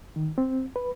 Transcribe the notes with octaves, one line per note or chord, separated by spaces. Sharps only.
D#3
C4
B4